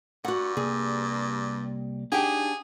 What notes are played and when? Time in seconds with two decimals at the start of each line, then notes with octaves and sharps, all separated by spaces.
0.24 G2 F#4 F#5
0.57 C2 G3 A#3 G#4
2.12 D4 D#4 G4 G#4 F#5 G5